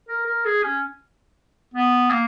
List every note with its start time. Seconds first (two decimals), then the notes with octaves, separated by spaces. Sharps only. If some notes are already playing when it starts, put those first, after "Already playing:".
0.09 A#4
0.26 A#4
0.45 G#4
0.63 C#4
1.74 B3
2.10 A#3